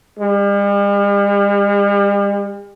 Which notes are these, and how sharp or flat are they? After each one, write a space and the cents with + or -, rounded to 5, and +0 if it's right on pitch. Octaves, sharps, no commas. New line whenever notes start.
G3 +45